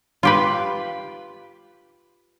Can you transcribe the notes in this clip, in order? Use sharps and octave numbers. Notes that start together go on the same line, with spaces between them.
F4 G4 B4